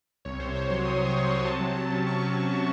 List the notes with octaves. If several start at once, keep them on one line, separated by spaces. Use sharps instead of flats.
C2 C#5
C3 C5
C2 C#5
F#3 C6
C2 D#6
C3
C#6
C2
F#3 C6
C3 A5
F#3
C3 A5
C#4
C3 C#6
F#3
C3
C#4